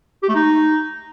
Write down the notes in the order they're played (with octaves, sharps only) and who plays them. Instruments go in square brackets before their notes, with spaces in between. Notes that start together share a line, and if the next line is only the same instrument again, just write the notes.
[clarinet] G4
A3
D#4